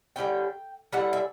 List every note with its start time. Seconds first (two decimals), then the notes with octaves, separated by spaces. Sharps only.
0.16 D3 G3 C#4 E4 G5
0.93 D3 G3 C#4 E4 F#5
1.13 E5